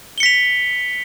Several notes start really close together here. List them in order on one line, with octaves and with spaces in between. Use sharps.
G7 C#7 B6 F7